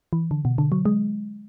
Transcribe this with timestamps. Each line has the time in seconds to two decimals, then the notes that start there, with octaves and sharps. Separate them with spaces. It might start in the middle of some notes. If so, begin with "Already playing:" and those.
0.13 E3
0.31 D3
0.45 B2
0.58 D3
0.72 F#3
0.85 G#3